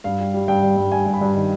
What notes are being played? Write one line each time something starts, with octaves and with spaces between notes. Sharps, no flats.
G2 F5
G3
G3
G2 G5
G2
G2
G2 G#5
G2
B5
G2
D#3